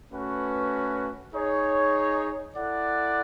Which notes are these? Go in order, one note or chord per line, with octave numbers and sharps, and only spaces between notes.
A3 C#4 F#4 B4
D#4 G#4 C#5
E4 A4 D5 F#5